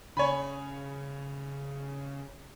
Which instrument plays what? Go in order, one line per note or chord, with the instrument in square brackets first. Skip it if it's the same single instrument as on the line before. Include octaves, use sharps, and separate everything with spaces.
[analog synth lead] C#3 [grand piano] C#5 G#5 B5